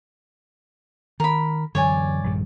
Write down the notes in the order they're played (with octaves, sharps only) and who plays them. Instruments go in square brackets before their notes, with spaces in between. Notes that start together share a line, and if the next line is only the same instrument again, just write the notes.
[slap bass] D#3 [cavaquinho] A#4 B5
[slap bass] F#2 D3 E3 [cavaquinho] C#5 D5 G#5
[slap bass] A#1 G2 D#3